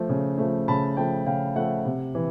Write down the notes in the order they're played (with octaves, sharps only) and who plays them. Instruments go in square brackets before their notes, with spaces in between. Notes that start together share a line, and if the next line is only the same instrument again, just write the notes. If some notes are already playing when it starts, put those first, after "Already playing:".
Already playing: [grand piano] F3 A3
C#3
F3 A3
C#3 A5 B5
F3 A3 G5 A5
C#3 F5 G5
F3 A3 E5 F#5
C3
E3